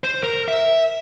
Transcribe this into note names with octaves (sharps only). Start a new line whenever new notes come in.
C5
A#4
E5